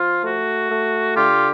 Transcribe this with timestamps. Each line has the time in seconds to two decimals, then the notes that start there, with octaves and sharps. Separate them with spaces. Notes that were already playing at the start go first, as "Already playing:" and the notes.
Already playing: F3 F4
0.23 A3 F#4
0.70 A3
1.16 D3 F4 G4